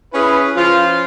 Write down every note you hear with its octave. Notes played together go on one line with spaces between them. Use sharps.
C#4 E4 G#4 B4
F3 C#4 F4